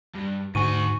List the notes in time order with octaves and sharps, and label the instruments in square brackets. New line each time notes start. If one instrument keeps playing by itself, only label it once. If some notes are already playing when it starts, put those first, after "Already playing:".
[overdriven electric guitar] G2
[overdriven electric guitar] D2 F#4 [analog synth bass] G#2 [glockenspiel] G#5 C#6 D#7